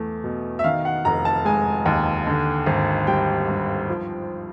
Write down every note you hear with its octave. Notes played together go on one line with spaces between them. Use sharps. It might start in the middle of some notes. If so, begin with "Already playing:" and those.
Already playing: E2 A3
B2
E5
D#3 F5
F#5
F1 A#5
A5
G#3 G#5
D#2
D3
G#1
G3 G5
G2
F3